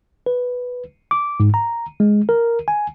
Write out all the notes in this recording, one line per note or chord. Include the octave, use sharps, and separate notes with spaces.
B4
D6
G#2
A#5
G#3
A#4
G#5